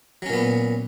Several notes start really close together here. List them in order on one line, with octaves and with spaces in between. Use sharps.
F#3 C#4 A#2 B3